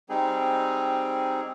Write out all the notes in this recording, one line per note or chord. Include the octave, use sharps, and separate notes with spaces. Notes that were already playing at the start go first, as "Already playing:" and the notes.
G3 C4 D#4 G#4